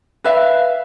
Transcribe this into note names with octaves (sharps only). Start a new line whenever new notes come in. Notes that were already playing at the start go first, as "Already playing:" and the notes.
B4 E5 F5